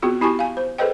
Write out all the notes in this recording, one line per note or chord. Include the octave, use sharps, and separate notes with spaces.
B3 C4 F4 F#4 G#4
B3 E4 G4 G#5 A5 C#6
F5 G#5
C5
G#4 A4 B4 C5 D#5 G5